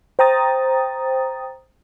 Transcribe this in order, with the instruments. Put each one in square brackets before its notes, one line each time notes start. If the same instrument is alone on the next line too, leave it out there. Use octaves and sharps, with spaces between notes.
[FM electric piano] C5 G5 A#5 D#6 A6